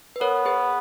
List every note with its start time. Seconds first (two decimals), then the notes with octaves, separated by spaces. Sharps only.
0.16 B4
0.21 B3 A#4 C#5
0.45 G#4 B4